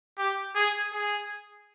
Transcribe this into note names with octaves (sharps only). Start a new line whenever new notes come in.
G4
G#4
G#4